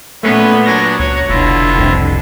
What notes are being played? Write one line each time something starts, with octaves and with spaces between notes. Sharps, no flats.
A#2 A3 B3 C#4 B4
F#3 D4 G#6 A#6
C#2 F#4 C#5
F1 B2 D3 E4 F4
C2 F2 C3